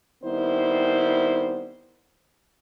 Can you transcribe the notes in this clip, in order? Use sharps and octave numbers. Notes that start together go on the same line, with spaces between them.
D#3 G3 B3 C4 E4 C5